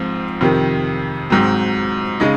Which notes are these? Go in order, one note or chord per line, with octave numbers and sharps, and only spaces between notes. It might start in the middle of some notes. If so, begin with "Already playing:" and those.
Already playing: G#2 F3 C4 F4
F2 C3 D#3
G#2 F#3 C4
C#3 G#3 D#4